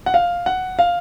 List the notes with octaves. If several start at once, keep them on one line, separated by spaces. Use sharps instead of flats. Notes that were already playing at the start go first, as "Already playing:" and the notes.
F#5
F5
F#5
F5